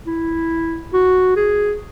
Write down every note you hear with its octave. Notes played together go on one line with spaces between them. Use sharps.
E4
F#4
G#4